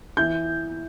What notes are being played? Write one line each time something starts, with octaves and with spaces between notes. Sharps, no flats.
E3 G6